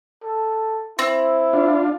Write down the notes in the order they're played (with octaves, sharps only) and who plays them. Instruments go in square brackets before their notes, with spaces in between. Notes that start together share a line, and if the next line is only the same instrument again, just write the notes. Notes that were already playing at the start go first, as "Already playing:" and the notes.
[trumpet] A4
[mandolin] C4 [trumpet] E4
[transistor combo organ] D4 F4